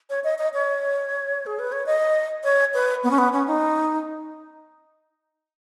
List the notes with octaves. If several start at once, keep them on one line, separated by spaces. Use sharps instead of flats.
C#5
D#5
D#5
C#5
G#4
B4
C#5
D#5
C#5
B4
B3
C#4
B3
C#4
D#4